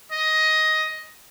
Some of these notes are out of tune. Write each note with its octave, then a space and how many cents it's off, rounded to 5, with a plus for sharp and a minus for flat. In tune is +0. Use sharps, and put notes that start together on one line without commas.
D#5 +10